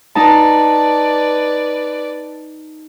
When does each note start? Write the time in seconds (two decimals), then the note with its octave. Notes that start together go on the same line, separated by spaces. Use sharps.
0.15 D#4 B4 D5 A5